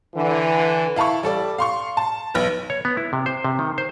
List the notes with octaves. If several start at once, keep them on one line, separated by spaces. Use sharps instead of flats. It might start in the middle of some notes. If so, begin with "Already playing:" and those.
D3 E3
E4 F5 A5 B5 C#6
G3 A4 D5
F5 C6 C#6
A5
B1 B4
C#5
B3
E4
C3
C5
C3
D#3
C5